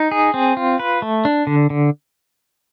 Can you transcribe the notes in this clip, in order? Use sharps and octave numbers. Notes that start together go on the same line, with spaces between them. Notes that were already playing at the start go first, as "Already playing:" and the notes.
Already playing: D#4
G#4
C4
F4
B4
A3
D4
D3
D3